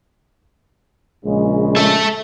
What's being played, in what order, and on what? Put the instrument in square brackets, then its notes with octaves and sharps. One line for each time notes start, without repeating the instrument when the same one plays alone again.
[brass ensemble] A#1 C#3 G#3
[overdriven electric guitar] A4 E5